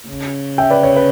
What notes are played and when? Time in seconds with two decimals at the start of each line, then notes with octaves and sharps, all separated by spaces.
0.08 C#3
0.58 E5 G5
0.70 B4 D5
0.83 C#5
0.96 B4